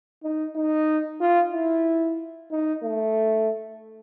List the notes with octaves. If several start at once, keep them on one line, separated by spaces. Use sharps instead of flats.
D#4
D#4
F4
E4
D#4
A3